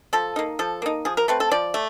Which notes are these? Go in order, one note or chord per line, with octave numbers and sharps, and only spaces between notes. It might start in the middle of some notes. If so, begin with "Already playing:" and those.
F3 A4
A#3 D#4
F3 A4
A#3 D#4
F3 G#4
A#4
A3 C4 B4
A4
F3 D5
A3